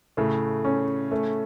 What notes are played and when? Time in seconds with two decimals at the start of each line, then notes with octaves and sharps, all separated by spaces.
0.17 A2 C#3 A3
0.65 C#4
1.11 A3